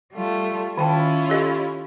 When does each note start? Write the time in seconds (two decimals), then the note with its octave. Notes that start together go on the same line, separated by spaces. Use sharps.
0.12 G3 A3 F4
0.78 D#3 C#4 E4 F4 G5 A5
1.29 G4 A4 D#5